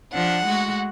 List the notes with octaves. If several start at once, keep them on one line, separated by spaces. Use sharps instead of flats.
F3 D4 F#5
G#3 A3 F#4